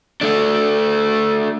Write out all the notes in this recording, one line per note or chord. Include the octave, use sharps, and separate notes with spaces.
A3 D4